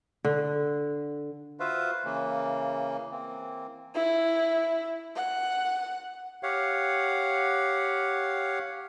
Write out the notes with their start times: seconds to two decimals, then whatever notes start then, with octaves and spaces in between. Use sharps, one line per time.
0.24 D3
1.60 F4 F#4 B4 C5 E5 F5
2.05 C#3 E3 A#3
3.11 E3 A#3 C4
3.95 E4
5.16 F#5
6.43 G4 C#5 F5 F#5